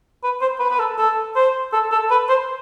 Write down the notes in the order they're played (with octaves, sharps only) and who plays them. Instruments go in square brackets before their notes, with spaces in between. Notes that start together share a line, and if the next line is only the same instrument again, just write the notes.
[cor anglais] B4
C5
B4
B4
A4
A4
C5
A4
A4
B4
C5